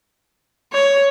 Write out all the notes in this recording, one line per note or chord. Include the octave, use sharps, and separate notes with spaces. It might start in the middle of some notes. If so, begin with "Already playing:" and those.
C#5